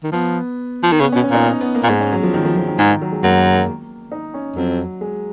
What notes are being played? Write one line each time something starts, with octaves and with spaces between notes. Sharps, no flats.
D#3
F3 B3
F3
D#3
C#3 B3
C#4
B2
C#4
A#2 D#4
C#4
B3
A#3
A#2
G#2 G#3
C#4
F#3
F3
D#3
F3
F3
D#3
G#2
D#3
F#3
G#3
F#2 A#3
D#4
C#4
F2 F#3
G#3